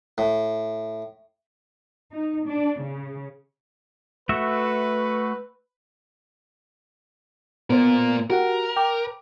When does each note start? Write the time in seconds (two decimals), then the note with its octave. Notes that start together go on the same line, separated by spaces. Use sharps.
0.18 A2
2.10 D#4
2.46 D4
2.79 C#3
4.29 A3 F#4 B4 E5
7.70 A#2 B3 A#4 C5
8.30 F#4 G4 A#4 F#5
8.76 G5 D6